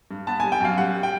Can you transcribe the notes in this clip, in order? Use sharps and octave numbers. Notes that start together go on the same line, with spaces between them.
G2
B3 A5
G3 G#5
G5
F#2 F5
G3 F#5
G3
G5